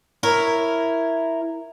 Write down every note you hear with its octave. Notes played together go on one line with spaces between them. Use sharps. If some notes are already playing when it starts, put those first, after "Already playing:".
E4 A#4 C#5